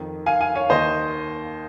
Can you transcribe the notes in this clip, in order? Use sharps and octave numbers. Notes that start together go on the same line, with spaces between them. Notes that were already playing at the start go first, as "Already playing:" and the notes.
Already playing: F2 D#3
F5 G#5
F5 G#5
C#5 F5
D#2 D#3 C5 D#5